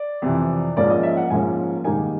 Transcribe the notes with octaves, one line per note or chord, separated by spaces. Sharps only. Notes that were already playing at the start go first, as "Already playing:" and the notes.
Already playing: D5
F2 C3 E3
G#2 F3 A#3 C#4 D5
D#5
E5
F#5
G#2 F3 A#3 C#4 G#5
G#2 D#3 G3 A#3 D#4 G#5